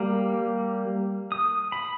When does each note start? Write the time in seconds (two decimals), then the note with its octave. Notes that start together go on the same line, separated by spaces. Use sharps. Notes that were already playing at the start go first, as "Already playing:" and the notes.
Already playing: G3 A#3
1.32 D#6
1.72 B5